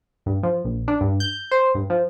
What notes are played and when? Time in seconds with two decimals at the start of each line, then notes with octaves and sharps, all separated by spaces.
0.26 G2
0.43 F3
0.65 A#1
0.88 D4
1.01 G2
1.20 G6
1.51 C5
1.75 G2
1.90 F3